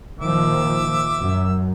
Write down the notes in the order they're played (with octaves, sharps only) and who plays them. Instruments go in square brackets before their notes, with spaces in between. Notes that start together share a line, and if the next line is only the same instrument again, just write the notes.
[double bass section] A#2 D#3 F3 [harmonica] E5 D6 E6
[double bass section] F#2